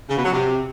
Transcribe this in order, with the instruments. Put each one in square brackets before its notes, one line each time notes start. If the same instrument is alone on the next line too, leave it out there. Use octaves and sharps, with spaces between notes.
[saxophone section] C#3
B2
F#3
C3